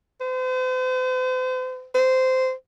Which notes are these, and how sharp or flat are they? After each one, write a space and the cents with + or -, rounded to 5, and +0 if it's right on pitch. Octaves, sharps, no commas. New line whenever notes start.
C5 -40
C5 -15